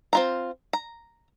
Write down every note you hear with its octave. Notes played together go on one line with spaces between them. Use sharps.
C4 F4 A#5
A#5